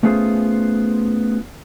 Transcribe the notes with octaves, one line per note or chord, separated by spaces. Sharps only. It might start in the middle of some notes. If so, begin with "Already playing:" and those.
A3 B3 C#4 F4 G#4 C5